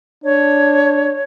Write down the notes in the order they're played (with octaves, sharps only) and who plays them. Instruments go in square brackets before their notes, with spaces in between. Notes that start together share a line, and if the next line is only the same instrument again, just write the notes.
[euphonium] D4 [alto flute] C#5